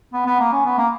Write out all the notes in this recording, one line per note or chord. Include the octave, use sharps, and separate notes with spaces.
B3
B3
A#3
C#4
B3
A#3